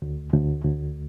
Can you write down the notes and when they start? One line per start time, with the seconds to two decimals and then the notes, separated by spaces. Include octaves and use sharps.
0.02 D2
0.33 D2
0.65 D2